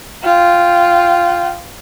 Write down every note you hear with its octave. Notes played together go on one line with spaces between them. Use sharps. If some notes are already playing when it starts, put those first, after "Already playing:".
F4 G5